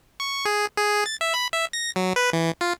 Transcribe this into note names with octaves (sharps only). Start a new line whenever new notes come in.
C#6
G#4
G#4
A6
E5
B5
E5
A#6
F#3
B4
E3
F4